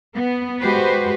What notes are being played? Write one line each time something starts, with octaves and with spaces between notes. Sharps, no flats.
B3
G#3 F#4 G4 B4 C5